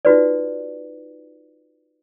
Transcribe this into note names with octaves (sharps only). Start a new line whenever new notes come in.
D#4 F4 F#4 B4 D5